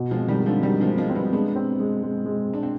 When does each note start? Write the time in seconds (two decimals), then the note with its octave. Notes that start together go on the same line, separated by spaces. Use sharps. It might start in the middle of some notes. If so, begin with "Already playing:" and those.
Already playing: B2
0.11 F3 G#3
0.17 C4
0.28 D#3 G3
0.40 G#3
0.46 D3 F3
0.63 D#3 G3 C4
0.81 F3 G#3
0.87 C4
0.98 F3 G#3
1.09 C4
1.15 G3 B3
1.33 G#3 B3 D4
1.56 C4
1.80 G#3
2.03 G#3
2.25 G#3
2.50 G#3 D4
2.63 C4